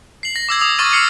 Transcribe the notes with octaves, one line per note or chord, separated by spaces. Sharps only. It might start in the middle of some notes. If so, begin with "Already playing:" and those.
C7 F#7
A#6
D6 E6 G#6
D#6
C#6 D6 F6 A6 D#7
E6 F6 C7 C#7